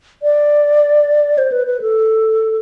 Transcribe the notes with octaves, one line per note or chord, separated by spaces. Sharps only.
D5
C5
B4
B4
A4